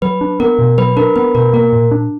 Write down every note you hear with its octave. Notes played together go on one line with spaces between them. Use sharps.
F#3 B4
D4
B3 A#4
B2
F#3 B4
D4 A#4
B3 B4
B2 A#4
A#3 A#4
A#2
D4